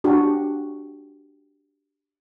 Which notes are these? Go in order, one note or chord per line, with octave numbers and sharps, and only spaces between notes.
D4 F#4 G4